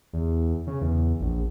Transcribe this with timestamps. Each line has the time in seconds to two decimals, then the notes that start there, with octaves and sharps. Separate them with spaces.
0.13 E2
0.67 C#3
0.81 E2
1.21 A#1